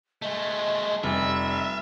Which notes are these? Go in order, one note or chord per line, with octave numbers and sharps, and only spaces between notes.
G#3 A3 D#5
F1 G3 E5